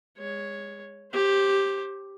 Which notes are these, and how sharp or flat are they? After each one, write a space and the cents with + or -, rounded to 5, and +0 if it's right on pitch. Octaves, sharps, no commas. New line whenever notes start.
G#3 -25 C#5 +0
G4 +0 C5 +30